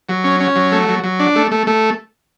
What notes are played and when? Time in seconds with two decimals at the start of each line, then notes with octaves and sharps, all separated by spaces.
0.09 F#3
0.24 C#4
0.40 C#4
0.56 F#3
0.72 A3
0.88 F#3
1.03 F#3
1.19 D4
1.35 A3
1.51 A3
1.67 A3